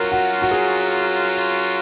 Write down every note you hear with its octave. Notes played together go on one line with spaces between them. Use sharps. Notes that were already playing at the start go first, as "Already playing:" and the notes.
Already playing: F#3 C#4 F4 A#4
F#4
F#4
G#4